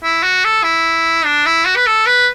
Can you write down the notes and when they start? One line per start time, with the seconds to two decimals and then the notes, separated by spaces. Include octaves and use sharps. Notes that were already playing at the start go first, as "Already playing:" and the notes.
0.03 E4
0.23 F#4
0.45 A4
0.64 E4
1.25 D4
1.46 E4
1.66 F#4
1.76 B4
1.87 A4
2.07 B4